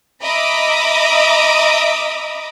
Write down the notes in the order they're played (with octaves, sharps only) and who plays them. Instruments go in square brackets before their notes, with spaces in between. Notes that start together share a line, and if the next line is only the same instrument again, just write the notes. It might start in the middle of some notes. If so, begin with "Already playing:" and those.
[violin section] D#5 E5 A#5 B5 D6 D#6